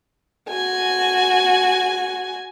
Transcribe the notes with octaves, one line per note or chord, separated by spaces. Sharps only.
F#4 G#5